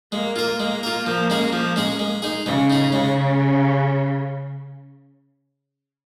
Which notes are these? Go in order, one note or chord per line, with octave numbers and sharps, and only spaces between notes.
G#3 A#3
F4 A#4
G#3 A#3
F4 A#4
F3
G#3 C#4 G#4
F3
G#3 C#4 G#4
G#3
D#4 G#4
C#3 G#3
D#4 G#4
C#3 G#3